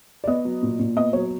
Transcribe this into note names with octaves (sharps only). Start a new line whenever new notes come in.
D5
B3 D#5
F#3
A#2
A#2
B3 D#5
F#3 C#5